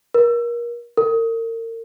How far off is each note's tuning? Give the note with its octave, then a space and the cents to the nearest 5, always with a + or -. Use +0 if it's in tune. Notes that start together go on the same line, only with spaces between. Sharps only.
A#4 +30
A#4 -35